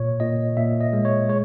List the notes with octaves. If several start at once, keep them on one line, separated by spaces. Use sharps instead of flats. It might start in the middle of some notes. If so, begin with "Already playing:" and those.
Already playing: A#2 C#5
A#2 D#5
A#2 E5
D#5
G#3
C#5
G#3 C#5